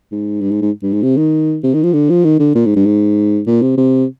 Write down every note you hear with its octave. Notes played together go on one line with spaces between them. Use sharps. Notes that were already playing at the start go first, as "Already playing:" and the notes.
G#2
G2
G#2
G#2
G2
G#2
C3
D#3
C3
D#3
F3
D3
F3
D#3
D3
A#2
G#2
G2
G#2
A#2
C3
C3